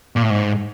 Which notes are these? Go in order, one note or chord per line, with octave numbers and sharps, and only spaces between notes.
A#2
A2
G#2